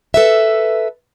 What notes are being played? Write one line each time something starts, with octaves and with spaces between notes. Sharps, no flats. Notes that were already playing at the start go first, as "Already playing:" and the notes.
A4 B4 E5